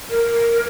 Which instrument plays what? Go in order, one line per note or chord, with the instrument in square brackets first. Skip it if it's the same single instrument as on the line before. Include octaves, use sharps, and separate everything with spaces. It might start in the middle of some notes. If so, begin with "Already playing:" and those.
[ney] A#4